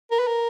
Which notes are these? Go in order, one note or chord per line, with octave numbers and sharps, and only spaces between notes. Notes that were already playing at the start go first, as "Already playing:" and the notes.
A#4
B4
A#4